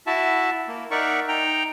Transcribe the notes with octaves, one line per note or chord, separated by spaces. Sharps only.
E4 F#4 E5 A5
A#3
D#4 A#4 D5 E5 F#5 C#6
D#4 G5 A#5